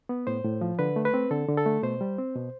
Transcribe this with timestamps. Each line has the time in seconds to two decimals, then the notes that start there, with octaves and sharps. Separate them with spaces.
0.09 B3
0.27 A2 C5
0.44 A2
0.61 F3
0.79 D3 B4
0.96 A3
1.05 B4
1.14 C4
1.31 D3 A4
1.49 D3
1.57 A4
1.66 A3
1.83 B2 C5
2.01 G3
2.18 C4
2.35 B2